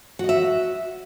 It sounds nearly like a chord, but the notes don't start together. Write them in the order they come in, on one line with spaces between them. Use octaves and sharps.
F#4 D#5 E5